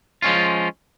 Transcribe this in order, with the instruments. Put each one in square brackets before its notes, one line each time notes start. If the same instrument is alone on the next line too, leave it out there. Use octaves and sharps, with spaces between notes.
[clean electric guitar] F3 G#3 C#4 F4